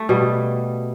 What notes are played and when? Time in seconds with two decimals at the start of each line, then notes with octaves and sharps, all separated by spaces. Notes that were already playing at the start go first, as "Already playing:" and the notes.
Already playing: A3
0.09 B2 G3